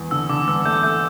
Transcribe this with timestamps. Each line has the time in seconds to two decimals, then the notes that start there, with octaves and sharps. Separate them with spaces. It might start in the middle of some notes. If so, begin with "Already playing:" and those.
Already playing: E2
0.11 D3 E6
0.29 D3 D6
0.48 E2 E6
0.60 E6
0.65 A3 G6
0.83 A3 G6